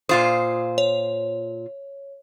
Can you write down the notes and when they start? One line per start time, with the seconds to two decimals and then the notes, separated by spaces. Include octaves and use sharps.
0.09 A#2 F4 C5 D#6
0.78 C#5